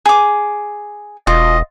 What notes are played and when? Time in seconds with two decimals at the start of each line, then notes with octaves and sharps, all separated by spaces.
0.06 G#4 D6
1.27 E1 F4 D#5